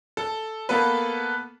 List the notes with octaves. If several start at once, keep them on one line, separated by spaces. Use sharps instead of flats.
A4
A#3 B3 A4 B4